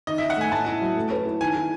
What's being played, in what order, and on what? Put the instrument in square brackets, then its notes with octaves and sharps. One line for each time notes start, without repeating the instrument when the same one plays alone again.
[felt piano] D#3 [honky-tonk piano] D#5
[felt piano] D#3 [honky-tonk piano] E5
[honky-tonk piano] F#5
[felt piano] A3 [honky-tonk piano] G#5
[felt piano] A2 [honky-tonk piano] A5
[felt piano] E4
F#3
A3
B4
E4
[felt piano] D#3 [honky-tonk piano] G#5
[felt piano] E4